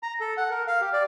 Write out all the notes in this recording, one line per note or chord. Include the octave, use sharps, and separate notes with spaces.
A#5
A4
F#5
A#4
F5
G4
D5